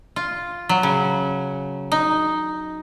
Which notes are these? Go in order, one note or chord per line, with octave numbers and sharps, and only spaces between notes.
F4
F#3
C#3
D#4